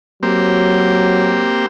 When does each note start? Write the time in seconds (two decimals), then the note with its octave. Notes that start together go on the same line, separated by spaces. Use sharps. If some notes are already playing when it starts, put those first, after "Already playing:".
0.23 F#3 A#3 C4 G4